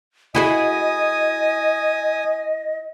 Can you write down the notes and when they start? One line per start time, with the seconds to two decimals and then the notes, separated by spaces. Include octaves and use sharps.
0.35 E4 F#4 G#4 D#5 G#5 D#6